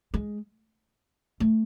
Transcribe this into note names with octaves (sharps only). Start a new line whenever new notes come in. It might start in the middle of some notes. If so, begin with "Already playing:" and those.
G#3
A3